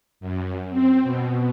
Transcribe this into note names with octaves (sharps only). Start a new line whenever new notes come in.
F#2
C4
B2